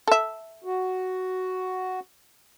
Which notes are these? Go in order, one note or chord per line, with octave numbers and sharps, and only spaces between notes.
A4 E5
F#4